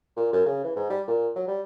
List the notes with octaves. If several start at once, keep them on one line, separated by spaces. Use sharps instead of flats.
A#2
F#2
C#3
E3
G#2
G3
A#2
F#3
G3